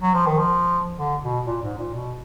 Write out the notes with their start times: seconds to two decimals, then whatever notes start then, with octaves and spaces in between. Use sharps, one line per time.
0.02 F#3
0.14 F3
0.27 D#3
0.39 F3
0.98 D3
1.23 B2
1.47 A#2
1.63 G#2
1.78 A#2
1.94 B2